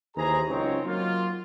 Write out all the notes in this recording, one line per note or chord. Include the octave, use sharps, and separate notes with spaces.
D#2 E3 G#4 C5 A#5
C#2 F#2 C4 D#4 C#5
F#3 A#3 F4